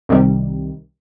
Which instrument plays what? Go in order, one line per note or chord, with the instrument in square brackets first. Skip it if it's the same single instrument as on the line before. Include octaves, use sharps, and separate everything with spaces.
[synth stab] C2 C3 D#3 G3